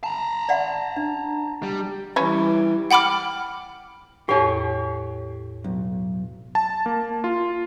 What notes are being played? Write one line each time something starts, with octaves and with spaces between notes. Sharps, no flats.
A5 A#5
D5 E5 F#5
D4
G3
E3 G3 C#4 B4 C#5
F#5 G5 B5 D6 F6
E2 A2 G4 C#5
B1
A5
A#3
F4